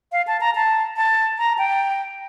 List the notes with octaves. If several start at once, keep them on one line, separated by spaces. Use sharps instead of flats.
F5
A5
A#5
A5
A5
A#5
G5